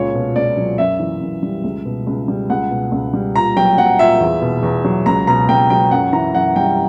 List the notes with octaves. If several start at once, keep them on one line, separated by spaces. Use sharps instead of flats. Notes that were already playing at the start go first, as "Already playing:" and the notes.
Already playing: C#2 A#2 C#5
B2
C#2 D5
F#3
F#2 E5
E3
F#2
G3
C#2
B2
C#2
G3
C#2 F#5
B2
C#2
G3
A#2 A#5
F#3 G5
F#3 F#5
A#2 E5
E2
B2
E2
F#3
C#2 A#5
B2 A#5
C#2 G5
F#3 G5
F#2 F#5
E3 A#5
F#2 F#5
G3 G5